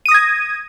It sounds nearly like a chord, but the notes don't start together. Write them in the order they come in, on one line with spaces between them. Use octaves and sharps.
D#7 D#6 A#6 G#6